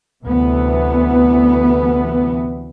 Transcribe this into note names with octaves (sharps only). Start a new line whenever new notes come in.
D2 C3 E3 B3